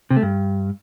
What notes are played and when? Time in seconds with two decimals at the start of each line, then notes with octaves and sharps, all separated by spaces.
0.10 C3
0.16 A3
0.22 G2